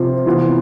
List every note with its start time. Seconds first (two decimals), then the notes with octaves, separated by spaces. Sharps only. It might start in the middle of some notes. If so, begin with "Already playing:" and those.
Already playing: C3 F3 C4 F4
0.26 C3 E3 B3 F4